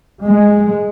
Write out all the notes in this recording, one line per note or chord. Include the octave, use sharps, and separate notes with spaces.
G#3